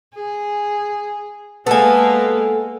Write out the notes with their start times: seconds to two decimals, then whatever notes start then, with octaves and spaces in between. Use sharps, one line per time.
0.15 G#4
1.67 G#3 A#3 B3 A4 G#5